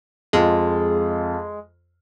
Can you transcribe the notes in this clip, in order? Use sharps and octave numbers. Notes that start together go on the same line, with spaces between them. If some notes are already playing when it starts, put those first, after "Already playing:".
F2 G#3 F4